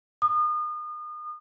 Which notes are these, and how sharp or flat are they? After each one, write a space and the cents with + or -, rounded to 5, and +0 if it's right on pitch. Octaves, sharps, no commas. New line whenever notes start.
D#6 -35